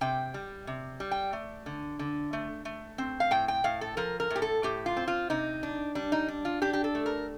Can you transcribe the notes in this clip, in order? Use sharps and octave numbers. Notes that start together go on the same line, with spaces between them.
C3 G5
G3
C3
G3
G5
A3
D3
D3
A3
A3
C4
F5
A2 G5
G5
A2 F5
A4
F3 A#4
A#4
A2
G4
A4
A2 G4
F4
C4
F4
C3 D#4
D4
G3 D4
D#4
D4
F4
D4 G4
G4
A4
A3
A#4